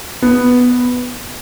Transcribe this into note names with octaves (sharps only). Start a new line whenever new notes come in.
B3